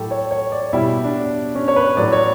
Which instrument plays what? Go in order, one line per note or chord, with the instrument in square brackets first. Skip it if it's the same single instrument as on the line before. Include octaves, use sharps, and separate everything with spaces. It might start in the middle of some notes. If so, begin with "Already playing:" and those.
Already playing: [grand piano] A2 F#3 G4 A4
C#5
C#5
D5
B2 G3 E4
D4
C#4
C#5
B4
A2 F#3 D5
C#5